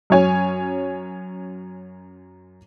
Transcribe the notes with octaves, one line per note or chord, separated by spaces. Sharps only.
F#2 C#4 C#5 G#5